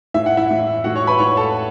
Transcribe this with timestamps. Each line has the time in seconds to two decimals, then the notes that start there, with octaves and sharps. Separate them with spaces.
0.14 A2 E3 E5
0.26 F#5
0.37 E4 E5
0.50 A2 E3
0.84 A2 E3 F#4 F#5
0.96 C#5 C#6
1.07 B4 B5
1.19 A2 E3 C#5 C#6
1.37 A4 A5